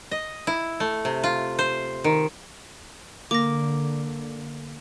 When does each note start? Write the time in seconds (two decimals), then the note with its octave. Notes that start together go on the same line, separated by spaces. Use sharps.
0.11 D#5
0.47 E4
0.80 A3
1.05 C3
1.24 F4
1.59 C5
2.04 D#3
3.31 D3 A#3 D6 A#6